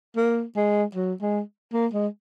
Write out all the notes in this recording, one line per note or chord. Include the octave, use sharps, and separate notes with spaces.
A#3
G#3
F#3
G#3
A#3
G#3